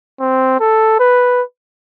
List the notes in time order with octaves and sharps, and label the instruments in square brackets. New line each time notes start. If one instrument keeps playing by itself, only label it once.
[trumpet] C4
A4
B4